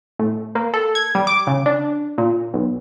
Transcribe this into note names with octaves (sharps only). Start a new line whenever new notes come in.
A2
A#3
A4
G#6
G3
D6
C#3
D4
A#2
B1